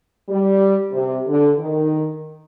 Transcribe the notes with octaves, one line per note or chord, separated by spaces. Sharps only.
G3
C3
D3
D#3